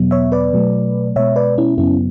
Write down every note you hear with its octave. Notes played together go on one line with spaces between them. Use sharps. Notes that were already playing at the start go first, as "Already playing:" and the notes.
Already playing: E2 B2 F#3 B3
C#5 E5
B4 D5
B2 F#3 A3
B2 G#3 B3 C#5 E5
B4 D5
C#4 E4
F#2 C#3 F#3 B3 C#4 E4